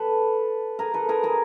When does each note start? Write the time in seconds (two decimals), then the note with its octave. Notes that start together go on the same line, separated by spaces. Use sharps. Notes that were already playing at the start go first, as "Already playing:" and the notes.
Already playing: A4 B4
0.79 G#4 A#4
0.94 A4 B4
1.09 G#4 A#4
1.23 G#4 A#4